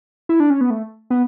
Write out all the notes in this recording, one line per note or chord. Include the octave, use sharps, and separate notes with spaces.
E4
D4
C#4
B3
A3
B3